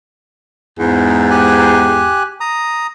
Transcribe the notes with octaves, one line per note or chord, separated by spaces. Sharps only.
E2 G#2
G4 G#5 F#6
A#5 D#6